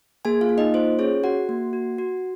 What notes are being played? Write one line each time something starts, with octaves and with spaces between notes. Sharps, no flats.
A#3 G#4 G#5
F4 F5
A#3
D#4 D#5
F4 C5
C#4 G#4 C#5
F#4 F#5
A#3
F#4
F#4